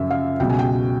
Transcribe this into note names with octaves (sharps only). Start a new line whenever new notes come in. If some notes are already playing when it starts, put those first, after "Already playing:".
Already playing: F#2 C#3 F3 E5
F5
C#2 B2 F#3 G5
G#5
G5